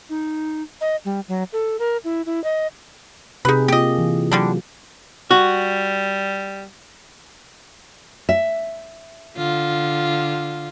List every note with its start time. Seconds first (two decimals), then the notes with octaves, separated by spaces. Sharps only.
0.10 D#4
0.81 D#5
1.05 G3
1.28 F#3
1.53 A4
1.79 A#4
2.04 E4
2.26 E4
2.44 D#5
3.45 C3 D#4 G4 G#4 B4
3.68 A#3 F4 G4 D#5
3.98 E3
4.32 D3 F#3 G3 D4
5.31 G3 F#4
8.29 E5
9.37 D3 F4